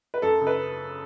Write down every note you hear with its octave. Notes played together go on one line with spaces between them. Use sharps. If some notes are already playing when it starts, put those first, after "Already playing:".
B4
F#2 A4
C#3
B4